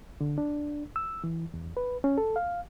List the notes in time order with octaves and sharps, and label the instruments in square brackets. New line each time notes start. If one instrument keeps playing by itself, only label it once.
[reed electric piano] D3
D4
E6
E3
E2
B4
C#4
A4
F5